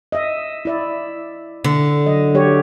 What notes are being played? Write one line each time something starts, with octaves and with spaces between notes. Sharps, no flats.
D#5 E5
E4 D5 E5
D3
F#3 D#5
F#3 G4 C#5